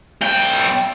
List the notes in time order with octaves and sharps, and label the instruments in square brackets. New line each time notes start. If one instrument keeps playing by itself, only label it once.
[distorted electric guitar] B1 G5